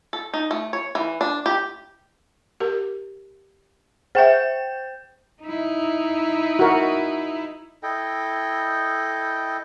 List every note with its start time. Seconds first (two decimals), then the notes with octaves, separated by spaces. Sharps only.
0.13 A4
0.34 D#4
0.51 A3
0.73 C#5
0.95 E3
1.21 D4
1.46 G4
2.60 G4 A#4
4.15 G#4 C5 E5 G5 G6
5.42 D#4 E4
6.59 F#4 A#4
7.83 E4 A4 D#5 G5